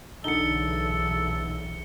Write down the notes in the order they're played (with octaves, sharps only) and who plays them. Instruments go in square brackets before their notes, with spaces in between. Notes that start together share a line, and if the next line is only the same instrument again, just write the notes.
[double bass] B1 E2 [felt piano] D3 D#4 [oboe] A4 [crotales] C#7 G7